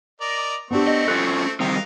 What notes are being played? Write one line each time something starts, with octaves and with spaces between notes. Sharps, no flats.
A#4 D5 D#5
A3 B3 C4 D4 G4 C#6
D#5
C#4 F4 A4 F#6
D#3 G3 C4 A#4 D#5 F5